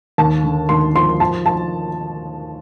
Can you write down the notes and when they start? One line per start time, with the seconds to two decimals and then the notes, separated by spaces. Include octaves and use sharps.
0.18 D#2 A5
0.44 D3
0.69 D#2 C6
0.95 F3 C6
1.20 F3 A5
1.46 F3 A5